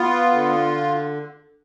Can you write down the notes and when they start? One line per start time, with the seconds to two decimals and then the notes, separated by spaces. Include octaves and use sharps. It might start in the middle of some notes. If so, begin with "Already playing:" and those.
Already playing: B3 F4
0.32 D3